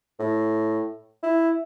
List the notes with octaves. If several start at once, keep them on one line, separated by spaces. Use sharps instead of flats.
A2
E4